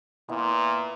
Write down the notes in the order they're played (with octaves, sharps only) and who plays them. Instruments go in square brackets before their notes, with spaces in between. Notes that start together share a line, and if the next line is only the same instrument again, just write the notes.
[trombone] A#2 [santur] B3 E4